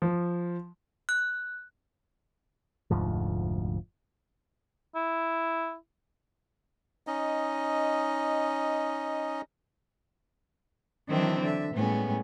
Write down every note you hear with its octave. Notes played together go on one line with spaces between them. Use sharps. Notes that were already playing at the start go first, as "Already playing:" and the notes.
F3
F#6
F1 D2 G#2 F3
E4
C#4 D#4 D#5
D#3 E3 F#3 C4 D4 E4
D3 E5
A2 G3 G#3 B3 C#4